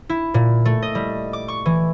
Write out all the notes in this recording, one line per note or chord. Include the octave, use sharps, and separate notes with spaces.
E4
A#2
A3
D#5
G3
D6
C#6
E3